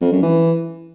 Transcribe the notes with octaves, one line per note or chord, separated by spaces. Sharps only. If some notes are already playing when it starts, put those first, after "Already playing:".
F2
F#2
E3